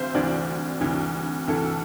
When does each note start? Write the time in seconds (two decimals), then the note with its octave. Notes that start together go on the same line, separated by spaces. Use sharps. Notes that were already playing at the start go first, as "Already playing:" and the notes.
Already playing: D2 C3 E3 C5 E5 F5
0.14 D2 C3 E3 D5
0.81 D2 C3 E3
1.47 D2 C3 E3 A4